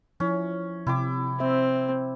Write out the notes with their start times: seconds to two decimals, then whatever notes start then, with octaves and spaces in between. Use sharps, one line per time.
0.20 F3 C#4 E4
0.87 C3 E4 G5 D6
1.40 C4 E5